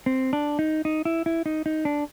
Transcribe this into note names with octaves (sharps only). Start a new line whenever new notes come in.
C4
D4
D#4
D#4
E4
E4
D#4
D#4
D4